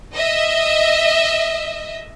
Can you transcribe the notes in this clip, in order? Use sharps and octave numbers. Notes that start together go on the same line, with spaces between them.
D#5 E5